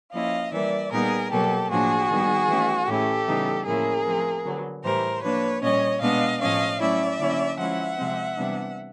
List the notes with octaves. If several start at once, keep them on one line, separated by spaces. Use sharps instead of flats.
F3 A#3 C#4 E4 D#5 F5
E3 G3 A#3 D5 E5
A#2 G3 B3 D#4 G#4 A#4
B2 F#3 A#3 G4 A4
A2 F3 A#3 D4 F#4 G#4
D#3 G3 B3
E3 A3 C#4
A2 E3 A3 C#4 E4 G4 A4
C#3 E3 G3 B3 D#4
A2 F3 A#3 C#4 E4 G#4 A#4
F3 A3 C4
D3 F#3 B3
A2 E3 G3 A#4 C5
F3 A#3 D4 B4 C#5
A#2 G3 A#3 C#4 C#5 D#5
B2 G#3 B3 D4 D#5 F5
A2 F3 A3 C#4 D#5 F5
F#3 A3 C#4 E4 D5 E5
D3 F#3 A#3 C#4 E4
F3 G#3 C#4 E4 E5 F#5
C3 F3 G#3 C4
C3 E3 G3 B3 D4